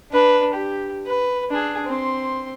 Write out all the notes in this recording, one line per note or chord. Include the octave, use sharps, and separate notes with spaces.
D4 B4
G4
B4
D4 G#4
C4 C6